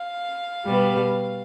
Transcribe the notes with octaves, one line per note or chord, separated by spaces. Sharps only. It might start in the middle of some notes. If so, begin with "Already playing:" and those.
Already playing: F5
B2 G3 B3